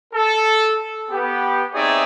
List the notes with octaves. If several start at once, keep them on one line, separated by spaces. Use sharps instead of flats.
A4
B3 G4
C4 D#4 G#4 C#5 D5 E5